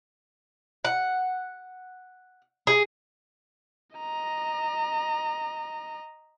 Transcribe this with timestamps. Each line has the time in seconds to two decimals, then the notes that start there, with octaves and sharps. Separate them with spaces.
0.85 F#5
2.67 G#4
3.96 D#5 A#5